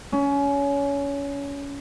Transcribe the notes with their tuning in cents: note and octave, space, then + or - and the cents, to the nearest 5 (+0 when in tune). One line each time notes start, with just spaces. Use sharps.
C#4 +25